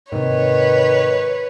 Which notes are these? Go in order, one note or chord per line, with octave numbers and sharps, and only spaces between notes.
G#2 C3 D#3 B4 C#5